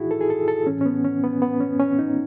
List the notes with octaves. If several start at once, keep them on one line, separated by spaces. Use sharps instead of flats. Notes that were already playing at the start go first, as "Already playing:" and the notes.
Already playing: A2 E3 D#4 E4 F#4 G#4
A4
G#4
A4
A4
A2 E3 C#4
C#4
B3
C#4
B3
B3
C#4
C#4
D#4